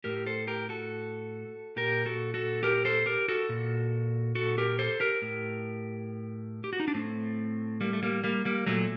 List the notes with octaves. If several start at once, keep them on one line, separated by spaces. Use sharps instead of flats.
A2 G4 A#4
A4 C5
G4 A#4
F#4 A4
A#2 G4 A#4
F#4 A4
F#4 A4
G4 A#4
A4 C5
G4 A#4
F#4 A4
A#2
F#4 A4
G4 A#4
A4 C5
G4 A#4
A2
G4
F#4
D#4
D4
A2 A3 C4
G3 A#3
A3
G3 A#3
G3 A#3
G3 A#3
A#2 F#3 A3